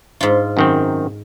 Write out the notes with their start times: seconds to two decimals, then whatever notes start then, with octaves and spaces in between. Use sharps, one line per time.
0.21 G#2 F4
0.57 F#2 D#3 C4